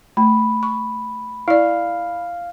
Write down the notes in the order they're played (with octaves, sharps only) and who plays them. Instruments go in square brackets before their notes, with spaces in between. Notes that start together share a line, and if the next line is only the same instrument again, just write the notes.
[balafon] A3 [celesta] B5
[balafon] C#6
[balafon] E4 D5 [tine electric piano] F5